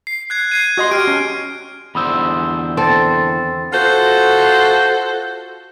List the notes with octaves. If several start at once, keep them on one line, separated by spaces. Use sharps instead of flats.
C7
F#6 G#6 C7
G#6 C7 D#7
F#4 D#5 C6
G4 F6 D7
C#4
E2 D3 C5 B5 D#6 E6
C4 A4 C6 A6
F4 F#4 A4 C5